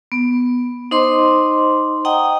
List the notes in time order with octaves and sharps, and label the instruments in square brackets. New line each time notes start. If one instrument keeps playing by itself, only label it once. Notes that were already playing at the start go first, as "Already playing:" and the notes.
[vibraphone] B3
D#4 C5 D#5 C6 D6
D#5 F#5 G5 A#5 D#6